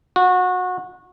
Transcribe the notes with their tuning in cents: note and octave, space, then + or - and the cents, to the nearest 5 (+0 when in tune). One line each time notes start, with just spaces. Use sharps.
F#4 -25